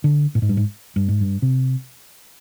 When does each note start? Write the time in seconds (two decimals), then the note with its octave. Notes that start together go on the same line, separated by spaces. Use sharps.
0.04 D3
0.35 A2
0.42 G#2
0.49 G2
0.57 G#2
0.96 G2
1.08 G#2
1.21 G2
1.42 C3